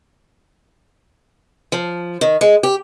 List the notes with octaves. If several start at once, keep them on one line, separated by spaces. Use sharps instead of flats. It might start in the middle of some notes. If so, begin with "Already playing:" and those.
F3
D#3
G#3
G4